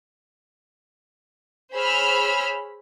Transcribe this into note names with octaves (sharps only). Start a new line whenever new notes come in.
G#4 C5 C#5 B5 E6 F6